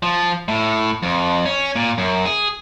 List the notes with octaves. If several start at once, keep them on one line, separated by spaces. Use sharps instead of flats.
F3
A2
F2
C#4
A#2
F#2
G#4